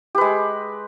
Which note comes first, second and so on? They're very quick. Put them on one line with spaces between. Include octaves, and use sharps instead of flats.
G4 B4 G#3